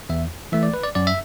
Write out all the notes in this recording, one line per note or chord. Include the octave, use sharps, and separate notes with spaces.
E2 E5
E3 A3 E5
D5
B4
D5
F#2 D5
E5